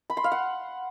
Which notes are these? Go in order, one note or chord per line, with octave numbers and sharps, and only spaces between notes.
B5
C6
F5
F#5